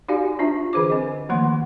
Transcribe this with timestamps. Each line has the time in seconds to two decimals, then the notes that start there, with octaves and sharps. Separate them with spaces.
0.08 D#4 F#4 G4 D5 F5 G#5
0.39 D4 F4 E5 A5
0.73 D3 E3 G#4 C5 D6
0.90 C4 D#5
1.29 D#3 F3 A3 A#3 F#5 C6